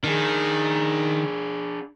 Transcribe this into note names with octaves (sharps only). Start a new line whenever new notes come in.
D#3 D4 G#4